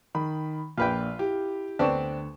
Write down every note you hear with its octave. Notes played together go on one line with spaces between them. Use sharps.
D#3 B5
A#1 A#2 F4 B4 G5
E4 G4
D2 B3 C4 D4 C#6 E7